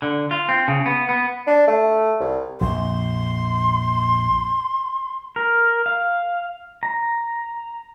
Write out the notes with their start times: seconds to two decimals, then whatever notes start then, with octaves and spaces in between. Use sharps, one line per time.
0.02 D3
0.31 F4
0.49 C4
0.68 C#3
0.86 B3
1.09 B3
1.47 D4
1.67 A3
2.20 C2
2.61 A#1 F2 C6
5.36 A#4
5.86 F5
6.83 A#5